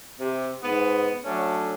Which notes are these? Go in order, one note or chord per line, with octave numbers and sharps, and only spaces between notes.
C3
G#2 B3
F#3 A3 C#4 D4